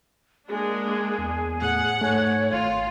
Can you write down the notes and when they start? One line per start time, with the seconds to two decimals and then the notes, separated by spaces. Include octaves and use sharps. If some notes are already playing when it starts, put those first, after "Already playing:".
0.49 G#3 A#3 D4 G#4
1.18 E2
1.62 A2 F#5
2.01 G#2 A3 C#5 G#5
2.52 G#1 F4 F5